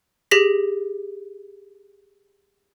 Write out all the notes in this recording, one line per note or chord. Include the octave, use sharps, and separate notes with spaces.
G4 G#4 A#6 B6